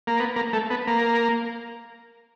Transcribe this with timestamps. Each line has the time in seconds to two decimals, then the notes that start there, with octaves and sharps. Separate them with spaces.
0.07 A#3
0.20 B3
0.36 A#3
0.53 A3
0.70 B3
0.87 A#3